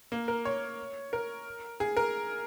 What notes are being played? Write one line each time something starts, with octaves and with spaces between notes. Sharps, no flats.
A#3
A#4
C#5
A#4
G#4
A#4